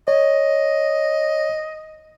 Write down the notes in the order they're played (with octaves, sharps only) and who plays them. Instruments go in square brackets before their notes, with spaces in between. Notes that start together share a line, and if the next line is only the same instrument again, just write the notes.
[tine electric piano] C#5 [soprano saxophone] D#5